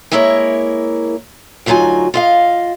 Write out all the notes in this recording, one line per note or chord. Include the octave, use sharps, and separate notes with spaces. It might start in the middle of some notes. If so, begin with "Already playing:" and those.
G#3 A#3 E4 A#4 B4 C#5
D2 G2 F#3 D#4 F4 G#5
F4 D#5 F5